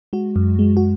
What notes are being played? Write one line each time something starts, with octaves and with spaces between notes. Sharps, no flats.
G#3 F#4
F#2
G#3
F#4